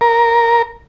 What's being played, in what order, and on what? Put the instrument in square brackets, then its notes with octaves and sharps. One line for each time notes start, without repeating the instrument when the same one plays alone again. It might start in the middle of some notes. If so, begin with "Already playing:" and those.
[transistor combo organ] A#4